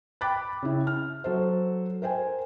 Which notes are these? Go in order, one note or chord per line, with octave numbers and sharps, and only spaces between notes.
G5 B5 D6 F#6 A6
C#3 E4
F6
F#3 A4 C5
A#4 C5 G5 G#5